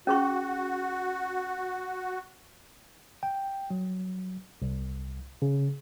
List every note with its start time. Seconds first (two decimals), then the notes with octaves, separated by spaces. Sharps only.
0.07 C#4 F#4 G#4 C#6
3.23 G5
3.70 F#3
4.62 C2
5.42 C#3